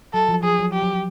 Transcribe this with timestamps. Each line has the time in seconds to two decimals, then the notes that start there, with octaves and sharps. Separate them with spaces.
0.13 F#3 A4
0.29 F3
0.43 F3 G#4
0.59 F#3
0.73 G4
0.83 F#3
0.93 F#3